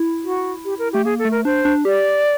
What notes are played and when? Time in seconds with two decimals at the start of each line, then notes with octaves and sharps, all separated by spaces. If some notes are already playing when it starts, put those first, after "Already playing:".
Already playing: E4
0.24 F#4
0.65 G4
0.79 A#4
0.92 A3 G4
1.05 A#3 G#4
1.19 A4
1.25 A3
1.31 A#4
1.45 D4 C5
1.65 D4
1.85 G4 D5